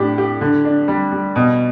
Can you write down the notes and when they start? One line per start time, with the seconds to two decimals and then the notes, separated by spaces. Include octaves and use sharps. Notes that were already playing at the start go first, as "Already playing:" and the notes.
Already playing: A2 D4 G4
0.18 G4
0.41 D3
0.65 D4
0.88 G3
1.12 G3
1.36 B2